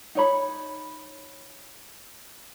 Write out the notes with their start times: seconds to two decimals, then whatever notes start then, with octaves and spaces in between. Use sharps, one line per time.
0.15 D#4 C#5 B5